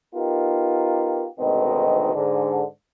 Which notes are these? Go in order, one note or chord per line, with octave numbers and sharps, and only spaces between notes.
B3 D#4 F4 G4 A#4
G#1 D2 B2 D#3 C4
G#2 D3